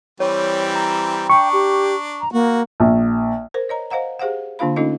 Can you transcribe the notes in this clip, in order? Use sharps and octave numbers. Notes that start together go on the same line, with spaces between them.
E3 G3 C4 C#5
A#5
D4 G5 C#6
G4
A#5
A#3 F#4
A#1
A#4 C5
C#5 D#5 A#5
C5 D#5 F5 F#5 A#5
G4 G#4 C5 F5 F#5
D3 A#3 D4 F4 F5 B5
A3 C#4 D#4 F4 A4 D#5